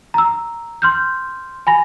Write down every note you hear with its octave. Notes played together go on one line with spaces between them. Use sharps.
A#5 E6
C6 F6 G6
G#5 B5 A#6